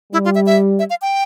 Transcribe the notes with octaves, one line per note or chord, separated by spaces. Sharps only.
G3 E4
F4
E5
E5
E5
F5
G5